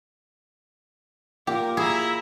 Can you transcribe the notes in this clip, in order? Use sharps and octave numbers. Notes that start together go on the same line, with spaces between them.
A#2 G4 A#4
E4 G#4 E5 A#5